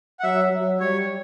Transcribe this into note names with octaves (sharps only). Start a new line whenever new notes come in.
F#5
F#3 E5
F#3
G3 C#5